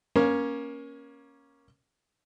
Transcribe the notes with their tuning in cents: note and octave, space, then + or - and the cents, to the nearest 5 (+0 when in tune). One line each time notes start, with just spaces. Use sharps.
A#3 +20 C#4 +0